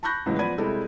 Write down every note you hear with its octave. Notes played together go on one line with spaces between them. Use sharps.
A5 B5 C#6 F#6 G6 A#6
C#2 A2 E3 F#3 G#3
F3 B3 D5 B5 G#6 D#7
C3 G3 G#3 E4 A4